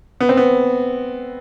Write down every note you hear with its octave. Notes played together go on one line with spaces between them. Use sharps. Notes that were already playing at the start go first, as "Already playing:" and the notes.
B3
C4
B3